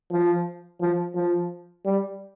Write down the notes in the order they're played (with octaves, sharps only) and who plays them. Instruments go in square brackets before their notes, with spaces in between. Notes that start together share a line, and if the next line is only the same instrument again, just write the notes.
[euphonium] F3
F3
F3
G3